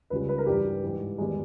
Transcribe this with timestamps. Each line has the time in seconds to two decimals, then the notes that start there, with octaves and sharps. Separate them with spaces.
0.10 C#2 C#3 G3 B4
0.29 B4
0.38 A#4
0.46 G2 E3 G3 G4
0.83 G#2 E3 G3
1.18 E2 D#3 G3 G#3